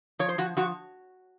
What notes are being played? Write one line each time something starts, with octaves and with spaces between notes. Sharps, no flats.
F3 C#5
C5
F3 F#4
F3 F#4